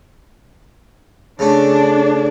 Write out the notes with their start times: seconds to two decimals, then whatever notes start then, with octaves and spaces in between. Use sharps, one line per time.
1.39 C#3 A3 C#4 D4